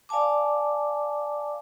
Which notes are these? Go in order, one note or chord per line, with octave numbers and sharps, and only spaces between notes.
D5 F5 G#5 A5 D6